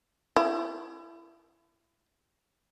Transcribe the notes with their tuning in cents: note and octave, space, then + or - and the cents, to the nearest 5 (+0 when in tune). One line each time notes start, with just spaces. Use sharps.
E4 +30